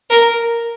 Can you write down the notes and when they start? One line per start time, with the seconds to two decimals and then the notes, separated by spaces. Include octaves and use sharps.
0.10 A#4